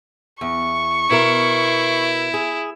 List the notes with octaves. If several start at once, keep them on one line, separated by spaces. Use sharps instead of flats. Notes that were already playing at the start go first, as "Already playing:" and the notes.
E2 C#6
B2 E4 A#4
G#4